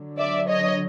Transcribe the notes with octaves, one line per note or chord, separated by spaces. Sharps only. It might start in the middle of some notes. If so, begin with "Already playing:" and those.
Already playing: D3 F#3
D5 E5
C#5 D#5